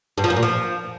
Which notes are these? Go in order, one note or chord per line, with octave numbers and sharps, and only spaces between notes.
G2
F3
F#2
A#2
F3